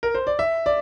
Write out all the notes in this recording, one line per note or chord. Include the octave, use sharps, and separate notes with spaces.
A#4
C5
D5
E5
D5